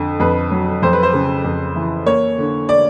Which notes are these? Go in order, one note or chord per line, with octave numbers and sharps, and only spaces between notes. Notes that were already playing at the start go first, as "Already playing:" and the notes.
Already playing: F2 D3
F2 B4
F#3
F2 C5
B4
C5
C#3
F2
E3
A#3 C#5
D3
D5